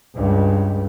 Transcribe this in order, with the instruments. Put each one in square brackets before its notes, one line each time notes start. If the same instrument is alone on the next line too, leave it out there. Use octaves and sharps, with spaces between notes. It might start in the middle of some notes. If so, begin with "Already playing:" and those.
[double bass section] C#2 G2